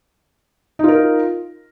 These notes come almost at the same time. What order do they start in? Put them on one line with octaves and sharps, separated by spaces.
D#4 F4 A#4